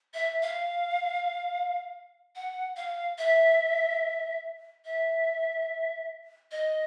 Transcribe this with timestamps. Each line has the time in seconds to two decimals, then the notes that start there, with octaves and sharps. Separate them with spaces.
0.14 E5
0.42 F5
2.36 F#5
2.77 F5
3.18 E5
4.85 E5
6.52 D#5